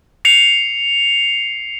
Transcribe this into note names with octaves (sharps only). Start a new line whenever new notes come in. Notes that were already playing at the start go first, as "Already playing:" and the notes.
C7 C#7 F7